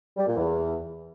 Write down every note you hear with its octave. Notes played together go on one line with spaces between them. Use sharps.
G3
A#2
E2